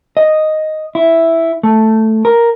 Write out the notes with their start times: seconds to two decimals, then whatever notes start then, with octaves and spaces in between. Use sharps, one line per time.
0.17 D#5
0.95 E4
1.63 A3
2.25 A#4